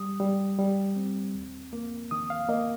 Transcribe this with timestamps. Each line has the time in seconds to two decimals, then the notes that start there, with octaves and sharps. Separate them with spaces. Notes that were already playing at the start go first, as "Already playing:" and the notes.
Already playing: G3 D#6
0.20 G3
0.59 G3
0.96 C4
1.35 D#2
1.73 A#3
2.11 D#3 D#6
2.30 F5
2.49 A#3 D#5